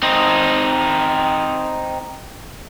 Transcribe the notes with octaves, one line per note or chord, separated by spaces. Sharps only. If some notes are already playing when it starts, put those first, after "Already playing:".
C4 D#4